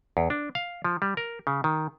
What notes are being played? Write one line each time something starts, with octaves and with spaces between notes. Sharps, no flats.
E2
D4
F5
F3
G3
A#4
C#3
D#3